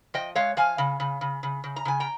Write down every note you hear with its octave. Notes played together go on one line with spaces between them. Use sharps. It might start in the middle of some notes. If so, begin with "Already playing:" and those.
F3 D#5 G5
G#3 C#5 F5
F3 F5 G#5
C#3
C#3
C#3
C#3
C#3
A#5
C#3 G#5
G5 A#5